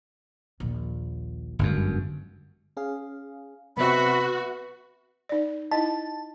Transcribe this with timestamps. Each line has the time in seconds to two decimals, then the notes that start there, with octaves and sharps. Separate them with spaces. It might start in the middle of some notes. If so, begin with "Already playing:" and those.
0.60 A#1 D#2
1.59 G1 F#2 G3 G#3
2.77 C#4 G#4 F5
3.77 C3 B3 C4 F#4 E5 B5
5.29 D#4 D5
5.71 D#4 E4 D#5 A5